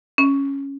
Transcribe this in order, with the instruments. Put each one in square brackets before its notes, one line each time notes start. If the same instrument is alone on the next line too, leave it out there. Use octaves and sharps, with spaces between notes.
[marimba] C#4